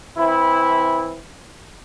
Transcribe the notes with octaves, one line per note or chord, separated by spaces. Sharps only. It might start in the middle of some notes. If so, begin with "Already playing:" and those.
E3 C4 E4